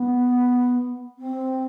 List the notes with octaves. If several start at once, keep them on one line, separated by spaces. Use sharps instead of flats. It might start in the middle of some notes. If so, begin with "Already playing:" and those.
Already playing: B3
C4